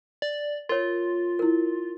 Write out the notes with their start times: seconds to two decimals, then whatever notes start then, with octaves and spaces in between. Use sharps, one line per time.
0.22 D5
0.69 F4 A#4 C#5
1.39 E4 A#4